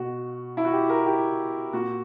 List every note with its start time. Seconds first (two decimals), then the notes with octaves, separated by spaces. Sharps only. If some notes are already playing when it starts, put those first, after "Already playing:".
Already playing: B2 F#4
0.57 E4
0.65 F#4
0.72 G4
0.90 A#4
1.06 G4
1.73 A#2 F#4